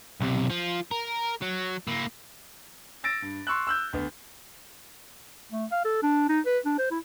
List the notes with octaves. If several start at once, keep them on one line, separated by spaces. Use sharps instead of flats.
B1 C3
F3 F4
A#4
F#3
A#3 E4
E6 A6 A#6 D7
G2
C6 C#6 E6 F#6
E6 F#6 G6
D2 B3
A3
F5
A4
D4
D#4
B4
D4
C5
E4